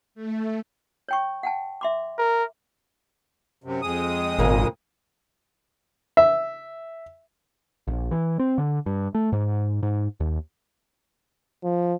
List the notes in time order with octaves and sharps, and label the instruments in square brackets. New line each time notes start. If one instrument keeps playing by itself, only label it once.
[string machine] A3
[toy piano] C#5 G5 C#6
F#5 G5 A5
E5 C6 D6
[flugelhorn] A#4
[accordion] F#2 C3
F2 G#3 D#6
[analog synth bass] G#1 [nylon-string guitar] A#2 C#3 A#3
[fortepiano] E5
[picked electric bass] A#1
E3
C4
D3
G2
A3
G#2
G#2
D#2
[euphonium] F3